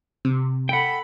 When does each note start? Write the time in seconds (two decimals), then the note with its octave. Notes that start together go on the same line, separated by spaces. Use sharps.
0.25 C3
0.69 A4 F#5 G5 B5